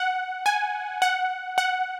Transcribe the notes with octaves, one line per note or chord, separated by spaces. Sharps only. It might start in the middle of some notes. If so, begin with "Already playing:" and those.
Already playing: F#5
G#5
F#5
F#5